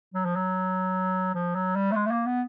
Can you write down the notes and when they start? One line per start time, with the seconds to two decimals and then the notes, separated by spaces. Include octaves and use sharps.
0.14 F#3
0.25 F3
0.36 F#3
1.35 F3
1.55 F#3
1.76 G3
1.91 A3
1.96 G#3
2.06 A3
2.11 A#3
2.26 B3